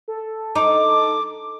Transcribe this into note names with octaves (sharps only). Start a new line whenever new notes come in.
A4
D#4 D6